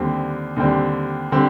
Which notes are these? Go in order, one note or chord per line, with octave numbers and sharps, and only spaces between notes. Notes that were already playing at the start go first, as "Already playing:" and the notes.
Already playing: D#2 D3 G3 C4
D#2 D3 G3 C4
D3 G3 C4